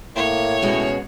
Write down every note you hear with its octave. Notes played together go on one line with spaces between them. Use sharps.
A2 A#3 C#5
B2 G#3 C#4 F#4